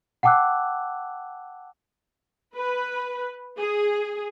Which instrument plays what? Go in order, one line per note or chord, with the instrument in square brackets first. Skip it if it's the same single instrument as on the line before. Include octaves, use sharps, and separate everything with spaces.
[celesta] F#5 G5 A5 D6 E6 F#6
[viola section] B4
G#4